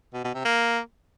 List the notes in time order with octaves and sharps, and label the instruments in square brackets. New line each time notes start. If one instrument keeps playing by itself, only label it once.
[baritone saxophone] B2
B2
C3
A#3